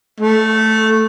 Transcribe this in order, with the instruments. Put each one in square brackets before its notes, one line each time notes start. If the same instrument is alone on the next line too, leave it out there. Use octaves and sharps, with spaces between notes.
[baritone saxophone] A3